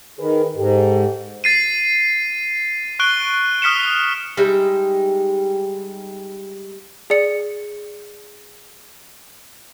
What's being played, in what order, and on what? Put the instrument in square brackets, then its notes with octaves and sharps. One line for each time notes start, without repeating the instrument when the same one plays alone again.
[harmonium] D#3 [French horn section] G#4 B4
[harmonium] G#2 [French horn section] G4 A4
[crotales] A6 C7 D#7
C#6 F#6 D7 G7
D#6 F6 B6 C#7 E7
[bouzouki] G3 G#3 D#4 E5
[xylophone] G#4 D5 C#7